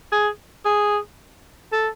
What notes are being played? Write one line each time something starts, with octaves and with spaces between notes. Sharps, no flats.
G#4
G#4
A4